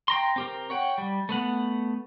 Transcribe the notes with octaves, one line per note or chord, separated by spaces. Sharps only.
G5 A#5 C6
C4 G4 A#4
C#5 F#5 G5
G3
A3 B3 F#5